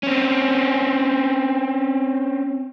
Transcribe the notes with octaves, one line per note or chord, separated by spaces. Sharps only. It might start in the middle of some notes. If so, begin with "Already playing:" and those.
C4 C#4